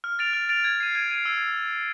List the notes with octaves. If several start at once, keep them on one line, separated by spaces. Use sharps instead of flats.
F6
A6 D7 F7
F6
A6 D7 F7
G#6
C7 D#7
G#6
C7 D#7
E6